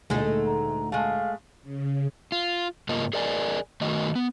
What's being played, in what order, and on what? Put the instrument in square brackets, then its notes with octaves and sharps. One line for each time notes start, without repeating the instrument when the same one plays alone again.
[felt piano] D2 A#2 [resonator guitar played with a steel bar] G#3 [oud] A3 D#4
[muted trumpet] A#5
[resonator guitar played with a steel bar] G#3 A3 [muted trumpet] F5
[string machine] C#3
[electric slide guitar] F4
G#2 C#3 A#3 F4 A#4 D#5
G#4 A#4 D5 D#5 G#5
D#3 A3 F#4 D#5
B3